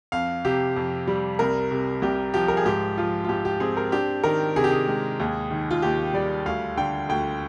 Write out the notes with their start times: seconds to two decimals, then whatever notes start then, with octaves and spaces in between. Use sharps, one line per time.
0.12 F2 F5
0.45 C3 G4
0.76 F2
1.07 G3
1.39 C2 A#4
1.71 C3
2.02 C2 G4
2.34 F3 G4
2.48 A#4
2.57 G#4
2.65 G#2 G4
2.98 F3 F4
3.24 F4
3.29 G#2 G4
3.45 G4
3.60 C4 G#4
3.77 A#4
3.92 D4 G4
4.24 D#3 A#4
4.56 C3 G#4
4.64 G4
4.72 G#4
4.88 G#3
5.20 D#2
5.51 D#3
5.71 F4
5.82 D#2 G4
6.13 G3 D5
6.46 D2 F5
6.77 D3 G5
7.09 D2 G5